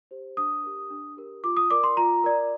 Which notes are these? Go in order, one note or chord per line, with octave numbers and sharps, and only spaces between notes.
G4 C5
D4 D#6
G4 A#4
D4
G4 A#4
F4 D6
D#6
A#4 D5 D6
C6
F4 A#5
A#4 D5